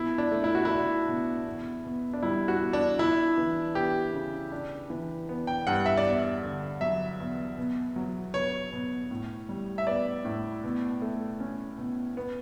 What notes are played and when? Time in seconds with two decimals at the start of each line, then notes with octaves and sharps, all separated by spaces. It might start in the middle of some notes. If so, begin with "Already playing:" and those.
Already playing: B2 E4
0.18 D4
0.31 A3
0.44 E4
0.55 F#4
0.65 D4 E4
1.07 B2
1.46 E2
1.84 B2
2.13 D4
2.23 G3 E4
2.48 F#4
2.61 E2
2.73 D4
2.99 D4 E4
3.37 E3
3.75 B3 G4
4.13 C#3
4.52 D4
4.90 E3
5.29 B3
5.47 G5
5.67 G2 F#5
5.86 E5
5.97 D5
6.05 E2 E5
6.43 D3
6.81 F#3 E5
7.20 E2
7.58 B2
7.96 F#3
8.34 B3 C#5
8.73 B2
9.11 A2
9.49 G3
9.78 E5
9.87 B3 D5
10.25 A2
10.64 B2
11.02 A3
11.40 C#4
11.78 B2
12.17 B3